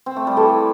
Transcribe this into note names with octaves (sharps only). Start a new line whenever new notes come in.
C4
A3
G3
E3 A4